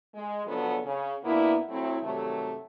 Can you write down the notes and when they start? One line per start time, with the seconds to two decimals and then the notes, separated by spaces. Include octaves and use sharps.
0.13 G#3
0.46 C#3 F3 F#3 B3 D4 A4
0.84 C#3 C#4
1.23 B2 A#3 B3 D4 E4
1.69 F#3 A3 C4 E4
2.01 G2 C3 D#3 F#3 A3